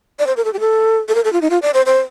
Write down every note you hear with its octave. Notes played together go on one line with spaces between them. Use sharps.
D5
C5
A#4
A4
G4
A4
A4
A#4
A4
F4
D#4
F4
D5
C5
C5